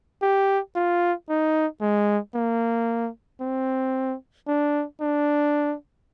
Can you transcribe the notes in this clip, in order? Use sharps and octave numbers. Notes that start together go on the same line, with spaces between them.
G4
F4
D#4
G#3
A#3
C4
D4
D4